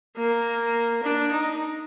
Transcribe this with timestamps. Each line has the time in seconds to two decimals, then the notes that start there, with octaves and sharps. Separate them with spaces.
0.17 A#3
1.04 D4
1.32 D#4